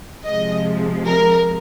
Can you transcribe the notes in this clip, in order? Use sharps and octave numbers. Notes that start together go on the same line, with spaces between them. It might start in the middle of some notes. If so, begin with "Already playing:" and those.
C3 F3 G#3 D#5
A#4